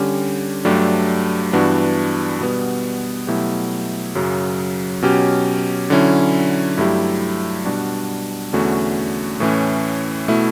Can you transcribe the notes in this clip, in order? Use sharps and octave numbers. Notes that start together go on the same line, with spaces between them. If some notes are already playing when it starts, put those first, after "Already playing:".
Already playing: D3 G3 C#4 G4
G2 F#3 A3 D4 G4
G2 E3 B3 D4 F#4
B2 G3 B3
B2 F#3 A3 E4 G4
F#2 C#3 F#3
B2 F#3 C#4 G4
D3 F#3 C#4 E4
G2 F#3 A3 E4 G4
B2 G3 D4 F#4
E2 D3 A3 C#4 F#4
A2 E3 A3 C#4
B2 A3 E4